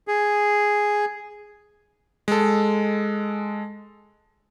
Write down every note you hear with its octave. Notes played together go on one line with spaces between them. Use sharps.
G#4
G#3 A4